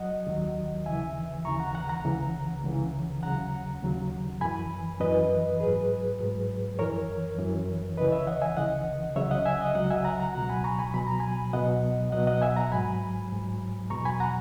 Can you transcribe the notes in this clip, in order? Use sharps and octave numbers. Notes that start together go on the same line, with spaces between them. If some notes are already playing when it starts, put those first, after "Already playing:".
Already playing: F#3 D#5 F#5
D#2 D#3 F#3
D#2 C#3 E3 E5 G#5
D#2 C#3 E3 A#5 C#6
F#5 A#5
F#5 A#5
F#5 A#5
C#2 C#3 E3
C#2 C#3 E3
D#2 C#3 F#3 F#5 A#5
D#2 C#3 F#3
F#2 E3 G#5 B5
F#2 E3 B4 D#5
G#2 F#3 G#4 B4
G#2 F#3
F#2 E3 A#4 C#5
F#2 E3
C#2 C#3 E3 B4 D#5
C#5 E5
D#5 F#5
E5 G#5
C#2 C#3 E3 D#5 F#5
C#2 C#3 F#3 C#5 E5
D#5 F#5
E5 G#5
D#5 F#5
C#2 C#3 F#3 D#5 F#5
E5 G#5
F#5 A#5
F#5 A#5
C#2 B2 F#3 F#5 A#5
G#5 B5
A#5 C#6
G#5 B5
C#2 B2 F#3 B5
A#5
G#5 B5
C#2 B2 F#3 D#5 F#5
C#2 B2 F#3 D#5 F#5
D#5 F#5
E5 G#5
F#5 A#5
G#2 F#3 G#5 B5
G#2 F#3
E2 B2 F#3 A#5 C#6
G#5 B5
F#5 A#5